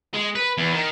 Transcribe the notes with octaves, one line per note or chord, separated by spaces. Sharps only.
G#3
B4
E2
D#3